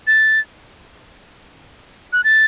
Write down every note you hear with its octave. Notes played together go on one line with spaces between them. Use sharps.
A6
F#6
A6